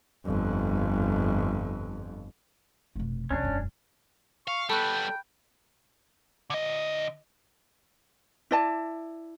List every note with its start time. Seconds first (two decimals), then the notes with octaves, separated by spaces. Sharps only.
0.26 G1 F2
2.95 F1 B2
3.31 E2 C3 C#4 D4
3.43 E1 F#2
4.48 F5 C#6
4.70 G3 B3 A4 G5 B5 C#6 F#6
6.50 D3 D#5
8.51 E4 D5 A5